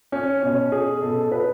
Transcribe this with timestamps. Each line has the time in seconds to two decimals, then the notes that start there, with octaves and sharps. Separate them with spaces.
0.12 C#4
0.42 B2 C#4
0.72 G#4
1.02 B2 A4
1.32 B4